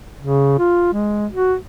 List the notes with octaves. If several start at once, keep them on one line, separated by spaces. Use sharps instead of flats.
C#3
F4
G#3
F#4